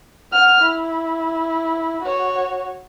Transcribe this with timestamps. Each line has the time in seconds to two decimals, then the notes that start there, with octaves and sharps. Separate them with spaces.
0.32 F#5 F6
0.62 E4
2.03 F#4 C#5